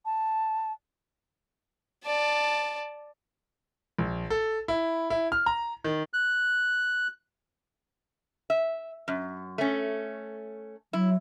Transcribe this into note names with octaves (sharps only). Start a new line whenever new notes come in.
A5
D5 A5
A#1
A4
E4
E4
F6
A#5
D#3
F#6
E5
F#2
A3 C#4
F#3 E4